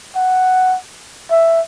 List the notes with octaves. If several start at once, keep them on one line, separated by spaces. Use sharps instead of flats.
F#5
E5